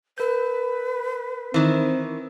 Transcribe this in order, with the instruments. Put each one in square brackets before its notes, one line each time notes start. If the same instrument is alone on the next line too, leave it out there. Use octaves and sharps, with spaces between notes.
[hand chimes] A#4 G6 [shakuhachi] B4
[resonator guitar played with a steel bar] D#3 E3 [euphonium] C4